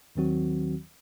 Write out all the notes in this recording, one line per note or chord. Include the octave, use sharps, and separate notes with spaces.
D#2 D#3 F#3 C4 F#4